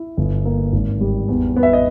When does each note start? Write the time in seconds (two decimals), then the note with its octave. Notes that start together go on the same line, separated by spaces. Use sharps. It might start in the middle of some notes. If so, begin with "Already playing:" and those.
Already playing: E4
0.17 G1
0.45 A#3
0.73 G#1
1.01 G3
1.28 E2
1.56 B3
1.63 E5
1.73 D#5